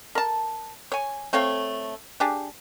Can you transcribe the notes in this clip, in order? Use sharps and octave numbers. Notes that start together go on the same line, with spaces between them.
A#4 A5
C#5 G#5
A3 C4 C#5 F5
D4 G4 G#4